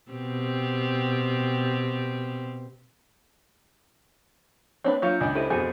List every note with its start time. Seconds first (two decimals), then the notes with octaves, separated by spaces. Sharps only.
0.10 B2 C4 G4
4.84 A#3 C4 D4 B4 C#5
5.02 F#3 D4 F4 G6 C#7
5.21 C#2 D5 D#5 G#5 D6
5.36 E4 G4 A4 C5 B5 D#7
5.50 F2 B2 C4 D4 G#4 G6 C#7 D#7